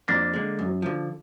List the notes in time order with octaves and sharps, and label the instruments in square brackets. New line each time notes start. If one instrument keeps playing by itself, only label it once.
[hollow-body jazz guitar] F2 [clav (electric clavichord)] A#3 D4
[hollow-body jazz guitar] D3 G#3
F#2
D3 F3